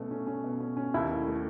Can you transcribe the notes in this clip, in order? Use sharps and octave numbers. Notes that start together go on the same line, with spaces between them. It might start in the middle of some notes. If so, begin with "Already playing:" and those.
Already playing: B2 A3 C#4
C#4
C#4
B2
C#4
C#4
D#2 E4
A3
A3